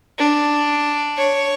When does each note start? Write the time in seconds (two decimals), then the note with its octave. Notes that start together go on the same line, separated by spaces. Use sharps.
0.18 D4
1.17 C#5